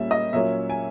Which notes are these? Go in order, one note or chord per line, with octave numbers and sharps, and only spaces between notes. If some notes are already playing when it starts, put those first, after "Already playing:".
Already playing: A#2 G3 A#3 C#4 E5
D#5
A#2 F#3 A#3 C#4 E5
G#5